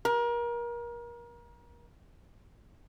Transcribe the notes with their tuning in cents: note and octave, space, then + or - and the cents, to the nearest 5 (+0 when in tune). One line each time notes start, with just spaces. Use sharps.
A#4 +30